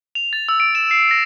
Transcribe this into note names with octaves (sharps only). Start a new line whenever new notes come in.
F7
A6
E6
D7
E7
C7
A#6